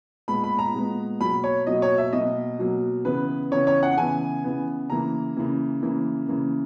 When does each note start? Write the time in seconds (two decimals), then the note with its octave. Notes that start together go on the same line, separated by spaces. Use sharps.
0.28 A#2 G#3 B3 B5
0.44 B5
0.59 A#5
0.74 A#2 G#3 B3
1.21 B2 F#3 A#3 B5
1.44 C#5
1.67 B2 F#3 A#3 D#5
1.82 C#5
1.98 E5
2.13 B2 F#3 A#3 D#5
2.59 B2 F#3 A#3
3.05 C#3 E3 B3 B4
3.51 C#3 E3 B3 C#5
3.67 C#5
3.83 F#5
3.97 C#3 E3 B3 G#5
4.44 C#3 E3 B3
4.90 C#3 E3 A#3 A#5
5.37 C#3 E3 A#3
5.82 C#3 E3 A#3
6.29 C#3 E3 A#3